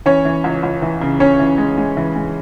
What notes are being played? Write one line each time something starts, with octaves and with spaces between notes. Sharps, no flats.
E3 C#4 C#5
E3
C#2
C#2
E3
C#3
C#3 C#4 C#5
E3
G#3
G#3
E3
G#3